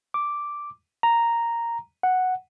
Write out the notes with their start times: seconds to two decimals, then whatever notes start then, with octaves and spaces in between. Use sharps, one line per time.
0.14 D6
1.03 A#5
2.03 F#5